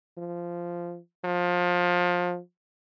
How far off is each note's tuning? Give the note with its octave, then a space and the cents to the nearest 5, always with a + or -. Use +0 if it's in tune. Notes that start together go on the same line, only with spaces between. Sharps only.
F3 -10
F3 +25